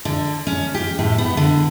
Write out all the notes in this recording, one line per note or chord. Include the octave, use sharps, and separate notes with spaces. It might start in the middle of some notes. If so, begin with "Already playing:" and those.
D3
C#4
G4
A2
B3
D3